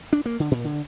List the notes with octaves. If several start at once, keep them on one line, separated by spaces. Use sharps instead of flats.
D4
A#3
D3
A#2
D3